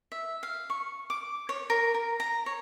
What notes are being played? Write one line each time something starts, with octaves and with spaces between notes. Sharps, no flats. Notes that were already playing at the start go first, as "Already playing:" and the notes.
E5
F5
C#6
D6
C#5
A#4
A#4
A#5
C#5